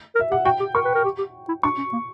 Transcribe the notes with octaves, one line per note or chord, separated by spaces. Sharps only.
A#4
E5
G4 F#5
F#4 G5
G4
A#4 C#6
B4
A#4
G4
G4
E4
D4 C#6
C#4
A#3